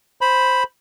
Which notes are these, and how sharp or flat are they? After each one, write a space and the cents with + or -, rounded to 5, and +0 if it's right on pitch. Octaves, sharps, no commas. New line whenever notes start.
C5 +0 B5 +0